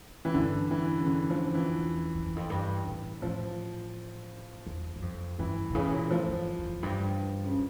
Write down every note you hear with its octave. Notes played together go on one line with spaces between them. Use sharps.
E3
G2 D3
E3
C#3
D3
F3
E3
E2
F2
E2
F2
G2
A2
A2 F3
E2
G2
F2
G2 E3
A#2
C#3 E3
A#2
A2 F3
G2
F2
E2
G2
C#3
D3